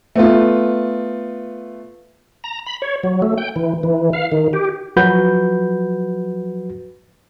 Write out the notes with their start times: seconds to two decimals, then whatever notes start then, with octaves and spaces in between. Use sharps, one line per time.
0.15 A3 B3 F4
2.44 A#5
2.66 B5
2.82 C#5
3.03 F#3
3.22 A3
3.38 G5
3.56 E3
3.83 E3
4.13 F5
4.32 D#3
4.53 G4
4.96 F3 F#3 F#4 B4 G6